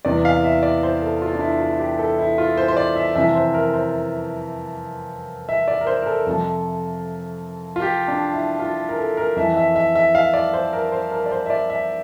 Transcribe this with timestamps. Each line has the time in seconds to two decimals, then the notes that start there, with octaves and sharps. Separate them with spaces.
0.05 E2 C3 E3 D5
0.25 F5
0.44 E5
0.63 D5
0.83 C5
1.02 A4
1.22 F4
1.35 D4
1.41 E4
1.60 F4
1.80 G4
1.99 A4
2.19 E4
2.38 F4
2.57 C5
2.68 C5
2.77 D5
2.96 E5
3.15 F2 C3 E3 E5
3.35 C5
3.54 A#4
3.74 C5
5.49 E5
5.68 D5
5.81 A#4
5.87 C5
6.02 A#4
6.06 A4
6.26 F2 C3 F3
7.76 F4
7.82 G4
8.08 D4
8.34 E4
8.59 F4
8.89 A#4
8.99 A4
9.17 A#4
9.36 F2 E3 E5
9.57 E5
9.76 E5
9.95 E5
10.15 F5
10.34 D5
10.53 C5
10.73 A#4
10.92 C5
11.12 A#4
11.26 D5
11.31 C5
11.46 E5
11.50 D5
11.70 E5